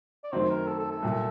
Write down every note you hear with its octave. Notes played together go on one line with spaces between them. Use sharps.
D5
F#2 D#3 F#3 A3 C4 C5
A#4
A4
A4
A4
C2 A#2 F#3